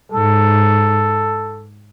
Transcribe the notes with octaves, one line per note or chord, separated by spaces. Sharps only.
G#2 A4